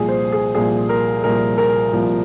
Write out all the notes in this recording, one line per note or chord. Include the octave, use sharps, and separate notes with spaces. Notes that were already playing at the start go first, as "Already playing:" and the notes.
Already playing: C2 A#2 F3 G#4
C5
G#4
C2 A#2 F3 G#4
A#4
C2 A#2 F3 A#4
A#4
C2 A#2 F3